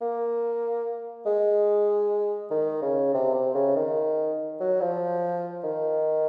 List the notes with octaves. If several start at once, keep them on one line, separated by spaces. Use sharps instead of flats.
A#3
G#3
D#3
C#3
C3
C3
C#3
D#3
F#3
F3
D#3